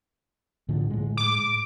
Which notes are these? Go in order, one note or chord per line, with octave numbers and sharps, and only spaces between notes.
A2 D3 F3
A2 G#3
D6